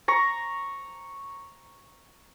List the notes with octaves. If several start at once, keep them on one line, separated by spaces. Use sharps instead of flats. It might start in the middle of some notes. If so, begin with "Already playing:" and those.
A#5 C#6